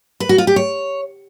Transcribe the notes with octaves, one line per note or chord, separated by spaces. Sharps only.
B4
F#4
F4
G4
C#5